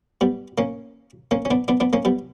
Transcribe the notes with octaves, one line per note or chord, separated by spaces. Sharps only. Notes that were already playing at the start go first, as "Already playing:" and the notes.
G3 B3
A#3 C#4
A#3 C#4
C#4
B3 D4
B3 D4
B3 D4
A#3 C#4
G3 B3